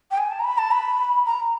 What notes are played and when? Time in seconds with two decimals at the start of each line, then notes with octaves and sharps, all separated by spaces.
0.11 G5
0.18 G#5
0.31 A5
0.39 A#5
0.44 B5
0.58 A5
0.71 B5
1.26 A#5